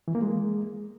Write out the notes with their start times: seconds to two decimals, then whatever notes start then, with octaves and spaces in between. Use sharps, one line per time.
0.08 E3
0.15 A#3
0.22 G#3